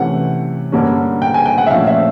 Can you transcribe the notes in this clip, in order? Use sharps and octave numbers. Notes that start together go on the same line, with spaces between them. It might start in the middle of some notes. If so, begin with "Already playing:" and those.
Already playing: C3 E3 A3 C#4 F#5
G2 D3 G3 A#3 C#4
G5
G#5
G5
F#5
E5
A#2 F3 A3 C#4 F5
E5